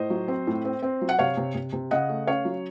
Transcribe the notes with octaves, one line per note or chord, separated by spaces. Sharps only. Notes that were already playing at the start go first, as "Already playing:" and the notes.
Already playing: A2 C5 D#5
F#3
C4
A2
C4
C4
F#3
F#5
C3 C#5 F5
C3
C3
C3
C#3 D#5 F#5
A3
C#4 C#5 F5
F#3